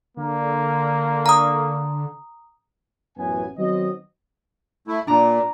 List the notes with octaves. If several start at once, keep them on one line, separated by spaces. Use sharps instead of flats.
D3 A#3
A#5 D#6
A1 F#2 E3 B3 C#4 G#5
D#3 F#3 B3 C4 C5 D#5
A3 E4
A#2 D4 A#5